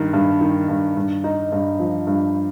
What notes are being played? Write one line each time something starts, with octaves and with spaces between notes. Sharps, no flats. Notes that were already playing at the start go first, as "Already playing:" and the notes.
Already playing: G2 D#3
G2
D#3
G2
G2
D#4
G2
F3
G2